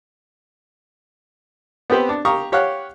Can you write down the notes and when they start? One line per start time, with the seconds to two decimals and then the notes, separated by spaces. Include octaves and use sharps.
1.90 B3 C4 G4 B4 C5
2.09 D4
2.25 G4 F5 A#5 C#6 D#6
2.52 G4 C#5 F5 F#5 F#6